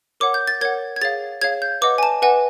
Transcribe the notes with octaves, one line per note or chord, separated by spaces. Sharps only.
A#4 C#5 F#5 D6
G6
A6
A#4 C#5 F#5 G#6
G#6
G#4 C#5 F5 A6
G#4 C#5 F5 G#6
G6
B4 D#5 F#5 D6
G#5
A5
B4 D#5 F#5 G#5